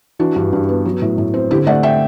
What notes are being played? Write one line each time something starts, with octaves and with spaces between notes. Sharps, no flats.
E3 D4 F#4
G2
G2
B3
F#3
A2
A2
C4
D3 E4 G4
A3 D5 F#5
E5 G5